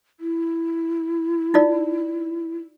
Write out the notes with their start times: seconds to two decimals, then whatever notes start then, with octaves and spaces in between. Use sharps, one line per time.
0.20 E4
1.54 D#4 F4 D5